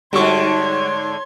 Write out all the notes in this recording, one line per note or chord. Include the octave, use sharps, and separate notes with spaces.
G#2 D3 G3 F#4 C#5 C6 C#6 G#6